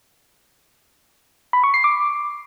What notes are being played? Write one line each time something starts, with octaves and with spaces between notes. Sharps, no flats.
B5
C#6
C7
D6